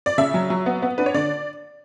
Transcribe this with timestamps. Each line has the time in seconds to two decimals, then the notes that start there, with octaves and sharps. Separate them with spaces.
0.06 D5
0.18 C#3 E5
0.34 F#3
0.50 F#3
0.66 B3
0.82 B3
0.98 D4 B4
1.06 C#5
1.14 D3 D5